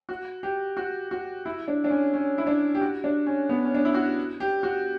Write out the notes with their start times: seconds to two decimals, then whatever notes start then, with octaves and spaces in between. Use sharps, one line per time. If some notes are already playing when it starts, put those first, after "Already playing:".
0.09 F#4
0.43 G4
0.77 F#4
1.11 F#4
1.45 E4
1.68 D4
1.84 D4
1.90 C#4
2.14 C#4
2.38 E4
2.47 D4
2.75 G4
2.81 F#4
3.04 D4
3.26 C#4
3.49 B3
3.64 C#4
3.75 D4
3.85 E4
3.94 F#4
4.40 G4
4.63 F#4